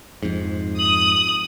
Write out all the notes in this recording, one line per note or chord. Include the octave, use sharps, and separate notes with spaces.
F2 G#2
D#6 F#7